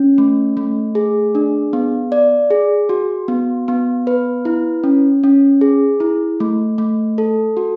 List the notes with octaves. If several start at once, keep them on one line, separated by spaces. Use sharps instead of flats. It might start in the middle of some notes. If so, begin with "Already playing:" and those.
Already playing: C#4
A3
A3
G#4
D4
B3
D5
G#4
F#4
B3
B3
B4
E4
C#4
C#4
G#4
E4
A3
A3
A4
F#4